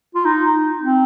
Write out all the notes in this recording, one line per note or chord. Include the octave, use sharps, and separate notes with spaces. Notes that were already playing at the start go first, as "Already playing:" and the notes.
F4
D#4
C4